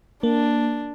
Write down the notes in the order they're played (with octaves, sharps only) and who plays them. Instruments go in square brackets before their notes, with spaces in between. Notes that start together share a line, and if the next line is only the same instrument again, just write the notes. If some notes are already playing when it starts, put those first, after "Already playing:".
[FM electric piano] A#3 [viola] D4